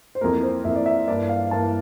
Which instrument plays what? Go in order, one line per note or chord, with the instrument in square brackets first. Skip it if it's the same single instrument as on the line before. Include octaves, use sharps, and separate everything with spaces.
[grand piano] C5
F2 E3 A#3 A#4
C5
F2 E3 A#3 E5
D5
E5
G2 E3 A#3 D5
F5
G2 E3 A#3 A5